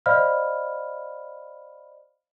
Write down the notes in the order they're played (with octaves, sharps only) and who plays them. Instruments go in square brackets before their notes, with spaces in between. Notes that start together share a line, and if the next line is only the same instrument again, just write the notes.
[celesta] C5 D5 D#5 F5 B5 F6